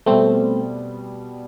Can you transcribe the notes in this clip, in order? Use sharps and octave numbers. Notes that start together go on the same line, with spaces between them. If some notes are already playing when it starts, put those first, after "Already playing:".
B2 G3 A3 B3 C4